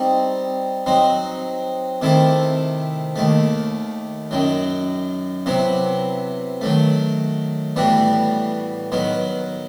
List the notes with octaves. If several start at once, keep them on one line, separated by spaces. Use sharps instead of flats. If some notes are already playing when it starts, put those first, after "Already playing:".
Already playing: G3 C4 D#4
F#3 C4 D#4
C3 D#3 A3 E4 A4
D#2 D#3 A3
F#2 D#3 F#3
C3 F#3 B3 E4
D#3 F#3 A3
A2 E3 G3 B3 F#4
D#3 F#3 B3